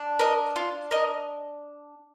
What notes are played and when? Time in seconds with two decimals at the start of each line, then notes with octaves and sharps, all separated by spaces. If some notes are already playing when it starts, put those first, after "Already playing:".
Already playing: D4
0.19 A#4 D#5
0.56 F4
0.91 A#4 D#5